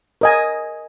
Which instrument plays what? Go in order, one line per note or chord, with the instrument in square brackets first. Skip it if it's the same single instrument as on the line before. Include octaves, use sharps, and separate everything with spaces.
[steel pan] A#4 D#5 G#5